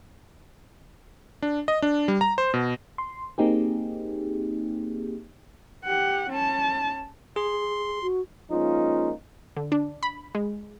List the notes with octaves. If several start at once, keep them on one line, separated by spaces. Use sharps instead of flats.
D4
D#5
D4
G3
A#5
C5
B2
C6
A#3 C4 D#4 G4 G#4
G4 F#5
C#4 A5
G#4 C6
F#4
F3 G#3 A#3 C#4 D#4 F4
D3
D4
B5
G#3